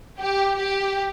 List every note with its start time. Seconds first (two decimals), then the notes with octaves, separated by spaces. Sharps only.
0.19 G4
0.58 G4